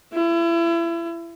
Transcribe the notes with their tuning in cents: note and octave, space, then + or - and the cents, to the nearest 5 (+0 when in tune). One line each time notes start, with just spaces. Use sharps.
E4 +35